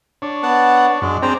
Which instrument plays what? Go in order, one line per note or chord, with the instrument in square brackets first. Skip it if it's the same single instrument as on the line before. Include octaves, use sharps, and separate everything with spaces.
[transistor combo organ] D4 C#5
[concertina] B3 F#5 A5
[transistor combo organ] F#2 D4 [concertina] G#3
[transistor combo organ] C4 D4 G#4 [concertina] C5 G5 A#5